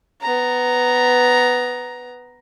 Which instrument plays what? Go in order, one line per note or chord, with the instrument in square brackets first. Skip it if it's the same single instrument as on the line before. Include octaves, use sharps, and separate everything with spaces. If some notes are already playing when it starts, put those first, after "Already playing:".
[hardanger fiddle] B3 A#5